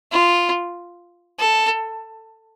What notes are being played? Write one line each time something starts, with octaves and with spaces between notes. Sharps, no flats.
F4
A4